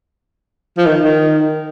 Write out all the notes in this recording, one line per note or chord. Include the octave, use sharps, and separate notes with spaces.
F3
D#3
D#3